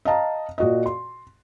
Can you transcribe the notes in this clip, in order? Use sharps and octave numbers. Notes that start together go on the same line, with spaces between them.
D#5 F5 A5 A#5
A#2 F#4 D#5
C6